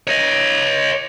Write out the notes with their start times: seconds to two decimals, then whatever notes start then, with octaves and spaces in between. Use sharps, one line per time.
0.07 C#5 D#5